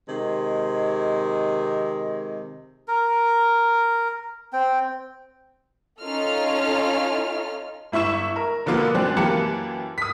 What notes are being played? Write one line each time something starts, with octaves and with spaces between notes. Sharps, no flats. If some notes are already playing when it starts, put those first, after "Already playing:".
C3 D#3 G#3
A#4
C4 G5
C#4 D#4 F4 A4 F6
G1 E4 E5 C#6 E7
A#4
B2 D3 F3 A#3 B3
F#2 C4 D4 F#6
F#2 E3 A#3 G4 A5 C#7
D#6 B6